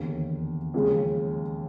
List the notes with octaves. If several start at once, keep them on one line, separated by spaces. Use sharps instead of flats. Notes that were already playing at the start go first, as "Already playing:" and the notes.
Already playing: E1 D#2 D3
D#2 C#3 F3 G#3